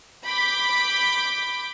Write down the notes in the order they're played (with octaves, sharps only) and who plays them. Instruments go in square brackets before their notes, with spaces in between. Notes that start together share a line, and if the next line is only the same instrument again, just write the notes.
[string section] B5 D6 G6 B6